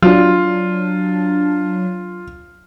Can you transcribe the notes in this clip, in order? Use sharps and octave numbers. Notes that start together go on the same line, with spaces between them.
F#3 D4 F4